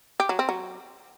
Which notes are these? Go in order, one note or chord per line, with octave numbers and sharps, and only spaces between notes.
G4
F#3
C4
F#3